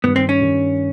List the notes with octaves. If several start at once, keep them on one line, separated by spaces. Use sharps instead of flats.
G2 D#3 G3 B3
C4
C#4
G2 D#3 G3